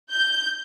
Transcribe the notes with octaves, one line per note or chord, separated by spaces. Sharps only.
G6